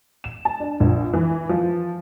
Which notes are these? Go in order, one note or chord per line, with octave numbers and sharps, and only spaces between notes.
E7
A5
D4
A#1
E3
F3